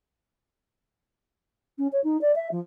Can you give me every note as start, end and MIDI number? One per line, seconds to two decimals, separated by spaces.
1.78 1.87 61
1.92 2.00 73
2.04 2.19 63
2.21 2.34 74
2.35 2.48 76
2.51 2.60 53